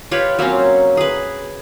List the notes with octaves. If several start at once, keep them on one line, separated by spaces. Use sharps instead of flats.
F4 G4 B4 C#5
F#3 A#3 C4 C#4
G#4 B4